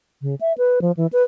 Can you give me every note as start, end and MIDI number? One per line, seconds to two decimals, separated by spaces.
0.22 0.35 49
0.41 0.53 76
0.58 0.79 71
0.82 0.92 53
0.97 1.07 52
1.13 1.23 71